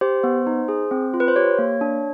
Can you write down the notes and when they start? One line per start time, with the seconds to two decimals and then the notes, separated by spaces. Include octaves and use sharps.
0.01 G4 C5
0.24 B3
0.47 D#4
0.68 G#4
0.91 C4
1.14 F4
1.20 B4
1.28 C5
1.36 G4 C#5
1.59 A#3
1.81 D4